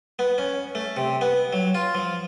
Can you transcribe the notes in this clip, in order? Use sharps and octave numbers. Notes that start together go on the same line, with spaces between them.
B3
C#4
A3
C3
B3
F#3
F4
F3